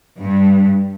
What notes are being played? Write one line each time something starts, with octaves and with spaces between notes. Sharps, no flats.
G2